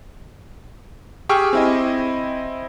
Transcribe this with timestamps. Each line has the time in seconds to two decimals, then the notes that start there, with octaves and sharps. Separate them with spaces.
1.29 G4 G#4 G5 C#6 E6 F6
1.53 C4 E4 D#5